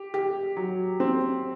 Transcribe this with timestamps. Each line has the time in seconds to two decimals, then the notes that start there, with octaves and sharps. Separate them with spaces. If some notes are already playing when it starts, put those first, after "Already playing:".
Already playing: G4
0.14 G4
0.57 F#3
1.00 C4